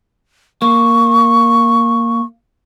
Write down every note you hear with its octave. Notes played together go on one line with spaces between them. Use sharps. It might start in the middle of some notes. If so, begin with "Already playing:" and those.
A#3 C#6